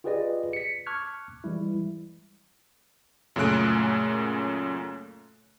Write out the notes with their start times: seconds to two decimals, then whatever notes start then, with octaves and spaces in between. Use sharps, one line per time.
0.04 F4 G4 G#4 B4 D5 D#5
0.53 B6 C#7
0.86 A5 C#6 D6 F6 F#6 G#6
1.44 E3 G3 G#3 E4
3.36 F#2 A#2 C#3 A3 F#6 D7